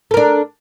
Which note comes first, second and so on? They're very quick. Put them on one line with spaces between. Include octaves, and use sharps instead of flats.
A4 A#4 D4